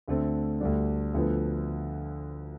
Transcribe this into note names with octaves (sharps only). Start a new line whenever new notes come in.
D2 D3 A3 C4
D2 D3 G3 D4
D2 D3 F3 B3